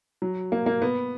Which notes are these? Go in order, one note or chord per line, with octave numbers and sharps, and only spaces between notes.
F#3
A#3
A#3
B3